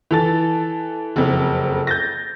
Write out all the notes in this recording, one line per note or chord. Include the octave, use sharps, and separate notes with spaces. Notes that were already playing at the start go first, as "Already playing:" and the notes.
E3 A4 A6
F#1 F2
G6 A6 A#6